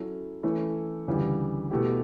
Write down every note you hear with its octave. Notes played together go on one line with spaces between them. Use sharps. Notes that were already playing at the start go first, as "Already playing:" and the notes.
Already playing: F#3 C#4 E4 A4
E3 A3 C#4 E4
D2 C#3 E3 G3
B2 A3 E4 G4